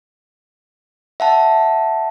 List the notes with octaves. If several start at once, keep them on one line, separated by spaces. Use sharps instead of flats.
E5 F#5 A5